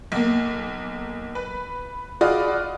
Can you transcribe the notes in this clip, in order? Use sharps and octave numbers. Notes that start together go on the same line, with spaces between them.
B1 A#3
B4
F4 F#4 G#4 D5 D#5 B5